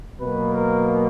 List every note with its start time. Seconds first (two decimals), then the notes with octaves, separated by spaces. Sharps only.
0.20 B2 F#3 A#3 B4
0.52 A#4